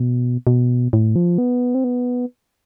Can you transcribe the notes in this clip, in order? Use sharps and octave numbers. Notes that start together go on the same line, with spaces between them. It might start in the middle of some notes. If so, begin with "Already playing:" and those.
Already playing: B2
B2
A2
F3
B3
C4
B3